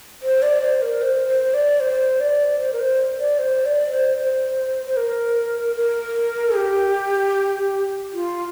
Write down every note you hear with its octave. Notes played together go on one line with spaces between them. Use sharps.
C5
D5
C5
A#4
C5
C5
D5
C5
D5
C5
A#4
C5
D5
C5
D5
C5
C5
C5
A#4
A#4
G4
F4